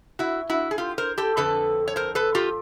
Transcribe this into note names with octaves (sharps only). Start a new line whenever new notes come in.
E4 F#4
E4 F#4
G#4
F4 G4
A#4 C5
G4 A4
F2 D3 F3 A4 B4
C#5
A#4 C5
A4 B4
F4 G4